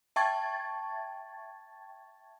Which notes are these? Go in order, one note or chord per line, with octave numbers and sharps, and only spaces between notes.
E5 G5 A5 C#6 G#6 A6